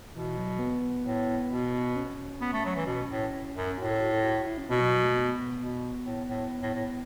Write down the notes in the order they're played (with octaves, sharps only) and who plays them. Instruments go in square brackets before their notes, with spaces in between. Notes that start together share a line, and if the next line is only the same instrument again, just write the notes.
[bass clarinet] B2 [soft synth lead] E3
[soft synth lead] F#3
B3
[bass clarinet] A2
B2
[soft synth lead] C#4
[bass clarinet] B3
A3
F#3
E3
B2
A2
F#2
[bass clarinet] A2 [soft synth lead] F#4
[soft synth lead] A4
F#4
A4
F#4
F#4
E4
C#4
[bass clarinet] B2 [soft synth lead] B3
[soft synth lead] F#3
F#3
A3
B3
[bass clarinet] B2
A2
A2
A2
A2